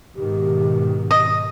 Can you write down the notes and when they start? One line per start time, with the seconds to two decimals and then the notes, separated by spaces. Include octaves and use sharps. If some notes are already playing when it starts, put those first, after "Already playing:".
0.16 G#2 B2 D#3 G4
1.11 D#5